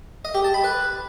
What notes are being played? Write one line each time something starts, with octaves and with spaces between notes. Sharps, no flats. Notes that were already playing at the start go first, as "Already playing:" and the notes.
D#5
G4
A5
B5
B4